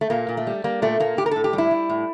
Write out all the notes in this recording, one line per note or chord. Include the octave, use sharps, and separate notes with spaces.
A3
A#2 A#3
A#2
A3
G3
G3 A#3
A#2 A3
A#2 A#3
A2 G4
A#4
A2 A4
G4
G3
E4
G3
A2